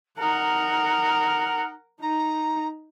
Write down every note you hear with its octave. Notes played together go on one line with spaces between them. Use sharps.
D#4 A#4 F#5
D#4 A#5